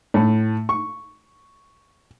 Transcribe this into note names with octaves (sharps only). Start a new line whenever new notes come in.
A2
C#6